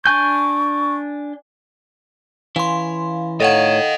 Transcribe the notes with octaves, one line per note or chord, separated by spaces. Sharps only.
D4 G#5 C#6 G6
E3 C#4 F5 C6
A2 A4 A#4 C#5 D#5 F5 F#5